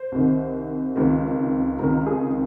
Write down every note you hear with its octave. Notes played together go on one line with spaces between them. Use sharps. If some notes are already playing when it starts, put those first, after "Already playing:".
Already playing: C5
C2 C3 D#3
C#2 C3 D#3
C#2 C3 D#3 A#4
G#4